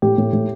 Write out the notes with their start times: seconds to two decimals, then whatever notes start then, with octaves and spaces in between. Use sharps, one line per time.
0.02 A2 G4
0.18 A2
0.33 A2